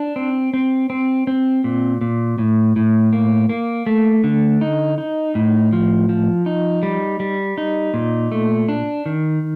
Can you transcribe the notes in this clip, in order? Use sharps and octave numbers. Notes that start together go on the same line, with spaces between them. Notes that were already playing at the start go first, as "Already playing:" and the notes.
Already playing: D4
C4
C4
C4
C4
A#2
A#2
A2
A2
A#3
A#3
A3
D3
D#4
D#4
A2
F3
F3
D#4
G3
G3
D#4
A#2
A3
D4
D#3